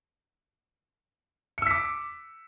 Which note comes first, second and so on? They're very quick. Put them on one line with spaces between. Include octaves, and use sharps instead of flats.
C#7 E6 B6 D6